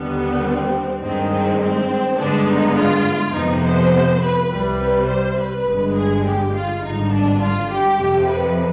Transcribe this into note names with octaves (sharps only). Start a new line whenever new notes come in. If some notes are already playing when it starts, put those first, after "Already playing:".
Already playing: D#2 D3 G3 B3
C4
G2 D#3 G#3 C4
C4
C4
G2 D3 G#3 B3 D4
D#4
F4
F2 C3 F3 B3 D#4
C5
B4
C2 C3 G3 B4
B4
C5
B4
G1 G2 D3 G#3
G#4
G4
F4
G#1 G2 D3 D#4
D4
F4
G4
F2 C3 F3
B4